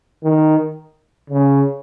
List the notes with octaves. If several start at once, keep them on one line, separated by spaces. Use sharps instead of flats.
D#3
C#3